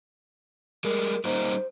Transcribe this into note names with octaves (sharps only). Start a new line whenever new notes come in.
G3 G#3 A#4
G3 A#3 D#4 C5